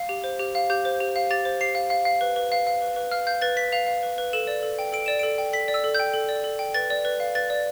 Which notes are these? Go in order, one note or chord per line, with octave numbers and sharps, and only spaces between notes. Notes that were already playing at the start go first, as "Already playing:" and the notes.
Already playing: F5
G4
C5
G4
F5
G4 G6
C5
G4
F5
G4 A6
C5
G4 C7
F5
F5
F5
B4
B4
F5
F5
B4
B4
F5 F6
F5 G6
B4 A6
B4 B6
F5 F7
F5
B4
B4
A4 E7
D5
A4
G5
A4 D7
D5 E7
A4 D7
G5
A4 B6
D5
E6
A4
G6
G5
A4
D5
A4
G5
B4 A6
D5
B4
F5
B4 A6
D5